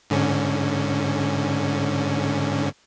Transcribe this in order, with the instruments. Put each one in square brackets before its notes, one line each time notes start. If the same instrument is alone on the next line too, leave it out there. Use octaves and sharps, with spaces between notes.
[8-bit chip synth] G#2 D3 C#4